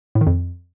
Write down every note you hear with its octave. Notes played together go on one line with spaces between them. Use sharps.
A2
D#3
F2